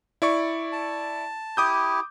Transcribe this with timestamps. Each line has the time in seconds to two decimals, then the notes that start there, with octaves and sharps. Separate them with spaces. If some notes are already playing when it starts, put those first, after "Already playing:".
0.22 E4 D5 C#6
0.72 A5
1.57 E4 G4 D6 D#6 G6